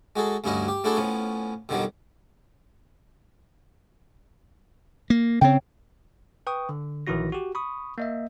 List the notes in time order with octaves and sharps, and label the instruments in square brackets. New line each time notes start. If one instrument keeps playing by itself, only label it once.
[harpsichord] G#3 F#4 G#4 A4
D2 G2 C#4 E4 F#4 D#5
G4
A3 D4 E4 F#4 G#4 A4
A2 F3 B3 C#4
F2 B2 D3 D#3 F#3 G3
[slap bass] A#3
[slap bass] C#3 C4 [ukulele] C#5 G5
[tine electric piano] B4 G5 C#6 D#6
D3
A#1 D#3 E3 E4 F#4 A#6
F#4 G4
B5 C#6 D#6
A#3 D#5 E5